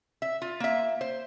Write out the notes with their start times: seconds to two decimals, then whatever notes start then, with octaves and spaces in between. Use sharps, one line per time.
0.22 E5
0.42 F4
0.60 A#3 E5
1.01 C5